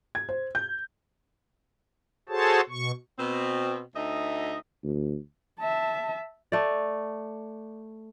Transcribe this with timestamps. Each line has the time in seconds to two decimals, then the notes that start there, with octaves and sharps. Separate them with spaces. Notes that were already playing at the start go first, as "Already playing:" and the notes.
0.15 G#6
0.29 C5
0.55 G6
2.29 F#4 G#4 A4 C5 C#5 A5
2.70 B2 C#6
3.18 B2 C4
3.95 D2 D#4 D#5 E5
4.83 D2
5.60 E5 A5
6.52 A3 D5